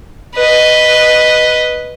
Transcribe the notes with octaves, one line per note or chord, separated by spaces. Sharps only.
B4 D#5